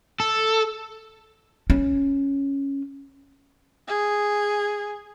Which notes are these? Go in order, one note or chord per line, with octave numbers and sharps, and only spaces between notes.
A4
C#4
G#4